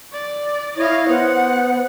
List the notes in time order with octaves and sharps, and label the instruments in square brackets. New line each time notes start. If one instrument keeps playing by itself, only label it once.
[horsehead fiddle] D5
[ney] E4 [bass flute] C#5 [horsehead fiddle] D#5 F5
[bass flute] B3 [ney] C5 [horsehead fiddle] F#5